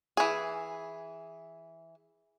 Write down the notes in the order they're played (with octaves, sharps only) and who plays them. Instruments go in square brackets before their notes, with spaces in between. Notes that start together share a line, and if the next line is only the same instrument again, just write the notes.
[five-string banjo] E3 G#4